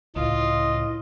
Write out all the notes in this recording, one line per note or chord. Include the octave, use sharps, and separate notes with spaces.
C#2 A2 F4 D#5